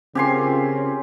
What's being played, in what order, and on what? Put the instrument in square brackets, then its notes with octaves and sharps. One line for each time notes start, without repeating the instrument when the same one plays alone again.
[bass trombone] C#3 [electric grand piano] C4 A#4 [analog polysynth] C#4 F4 [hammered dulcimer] G4 G#5 C6